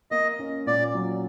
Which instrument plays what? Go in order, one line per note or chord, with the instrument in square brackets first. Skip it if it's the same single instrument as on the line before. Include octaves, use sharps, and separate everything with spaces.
[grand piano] A#3 [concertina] D#5
[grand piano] C#4
[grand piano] A#2 [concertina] D5
[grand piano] F#3